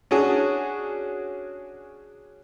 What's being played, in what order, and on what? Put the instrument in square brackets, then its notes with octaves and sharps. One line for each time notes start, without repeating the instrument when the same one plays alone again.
[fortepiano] C#4 D4 F#4 G#4